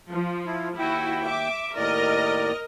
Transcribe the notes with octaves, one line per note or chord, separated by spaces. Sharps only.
F3
E4
D#2 E4 F#4 G5
E5 D6
D#2 A2 A#4 D5 D#5